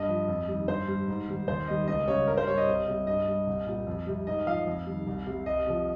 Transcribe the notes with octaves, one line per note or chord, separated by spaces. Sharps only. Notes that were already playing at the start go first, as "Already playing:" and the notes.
Already playing: G2 D#5
F3
F2
D#3 G3
G2 C5
G3
G#2
D#3 G3
D#2 C5
D#3 G3 D#5
C#2 D#5
C#3 G3 C#5
G2 A#4
C5
G3 C#5
D#5
C2
C3 G3
G2 D#5
G3
C2
A#2 G3
F2
C3 G3
G#2 D#5
F3 F5
F2
D#3 G3
C2
C3 G3
C2 D#5
C3 F3